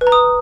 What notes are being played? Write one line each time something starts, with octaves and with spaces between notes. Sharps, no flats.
B4
A#5
D#6